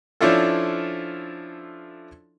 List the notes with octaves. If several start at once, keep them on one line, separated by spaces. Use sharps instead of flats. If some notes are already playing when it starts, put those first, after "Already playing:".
F3 C#4 D4 E4 F4 A4